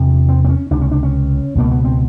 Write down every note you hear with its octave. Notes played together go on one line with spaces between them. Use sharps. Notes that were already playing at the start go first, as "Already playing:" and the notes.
Already playing: E2 C3
C4
C4
C#4
C#2 C3 D4
C#4
D4
C#4
C#2 B2 A#3
B3
C4